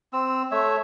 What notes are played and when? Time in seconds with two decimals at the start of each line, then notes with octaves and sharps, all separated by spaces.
0.13 C4 E6
0.51 A3 C#5 E5 E6